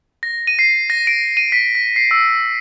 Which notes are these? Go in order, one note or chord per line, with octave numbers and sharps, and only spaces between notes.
A#6
D#7
C7
A#6
D7
D#7
B6
B6
C7
E6